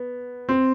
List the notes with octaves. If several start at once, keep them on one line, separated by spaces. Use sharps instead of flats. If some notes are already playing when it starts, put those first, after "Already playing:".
Already playing: B3
C4